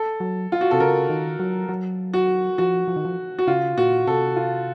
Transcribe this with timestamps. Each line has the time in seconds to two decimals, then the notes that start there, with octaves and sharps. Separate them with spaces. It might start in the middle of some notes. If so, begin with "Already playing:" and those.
Already playing: A4
0.20 F#3
0.52 F4
0.61 F#4
0.71 C3 A4
0.80 C#3 A#4
1.10 D#3
1.40 F#3
1.69 F#3
2.14 F#4
2.58 F3 F#4
2.88 F3
2.96 D#3
3.05 F3
3.39 F#4
3.47 C#3 F4
3.78 A#2 F#4
4.07 C3 A4
4.36 F4